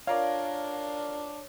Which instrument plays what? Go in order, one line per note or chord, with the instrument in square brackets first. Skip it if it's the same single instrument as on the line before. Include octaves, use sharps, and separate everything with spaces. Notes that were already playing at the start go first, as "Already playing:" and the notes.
[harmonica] D4 [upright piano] F4 A#4 D5 [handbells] C#5 [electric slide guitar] F5